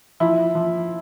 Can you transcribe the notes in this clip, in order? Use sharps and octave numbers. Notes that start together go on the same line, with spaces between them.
F3 E4
F3